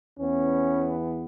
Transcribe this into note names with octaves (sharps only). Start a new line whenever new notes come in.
E2 E3 B3 C#4